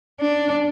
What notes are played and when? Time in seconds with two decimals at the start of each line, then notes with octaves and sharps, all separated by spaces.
0.21 D4